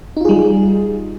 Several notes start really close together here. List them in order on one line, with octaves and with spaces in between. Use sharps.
D#4 F4 G#4 G3